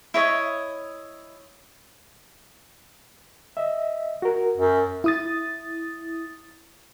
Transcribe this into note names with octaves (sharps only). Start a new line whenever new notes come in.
E4 C#5 D#5
D#5 E5
F#4 A#4
F#2
E4 D#6 A6